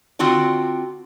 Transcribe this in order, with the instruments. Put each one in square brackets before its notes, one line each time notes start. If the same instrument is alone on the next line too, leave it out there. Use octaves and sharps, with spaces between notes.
[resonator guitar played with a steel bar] D3 C4 F4 F#4 D5